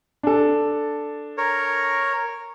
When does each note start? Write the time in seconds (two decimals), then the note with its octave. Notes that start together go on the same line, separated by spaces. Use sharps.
0.23 D4 A4
1.38 A#4 C#5